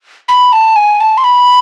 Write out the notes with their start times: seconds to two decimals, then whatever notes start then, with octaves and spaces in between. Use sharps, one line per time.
0.28 B5
0.53 A5
0.76 G#5
1.00 A5
1.18 C6
1.24 B5